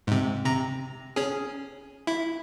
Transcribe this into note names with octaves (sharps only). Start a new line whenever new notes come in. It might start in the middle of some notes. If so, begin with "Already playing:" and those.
G#2 C3
C3 A#5
C#4 G#4
E4